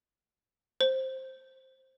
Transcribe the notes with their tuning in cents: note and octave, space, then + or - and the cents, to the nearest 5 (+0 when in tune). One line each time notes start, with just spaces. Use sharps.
C5 +5